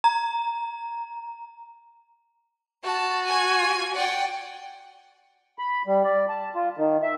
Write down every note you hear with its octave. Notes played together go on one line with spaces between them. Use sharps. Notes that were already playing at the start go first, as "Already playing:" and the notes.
A#5
F#4 A5
G#5 G#6
D5 F#5 G5
B5
G3
D5
A5
F4
D#3
E5